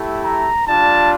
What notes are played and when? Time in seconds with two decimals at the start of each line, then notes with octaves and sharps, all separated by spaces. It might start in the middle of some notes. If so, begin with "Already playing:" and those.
Already playing: A3 E4 G4
0.22 A#5
0.66 G3 D4 F4 A5